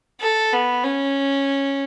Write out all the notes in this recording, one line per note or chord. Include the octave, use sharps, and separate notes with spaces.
A4
B3
C#4